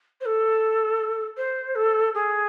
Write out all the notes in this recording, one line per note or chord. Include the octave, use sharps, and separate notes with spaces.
C5
A4
C5
A4
G#4